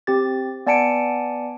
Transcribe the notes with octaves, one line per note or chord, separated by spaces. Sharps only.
C4 G4 A6
B3 D5 G#5 A5 C#7 D7